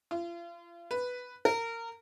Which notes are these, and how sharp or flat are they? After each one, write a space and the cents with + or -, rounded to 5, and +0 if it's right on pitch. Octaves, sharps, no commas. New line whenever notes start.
F4 -35
B4 +0
A#4 -25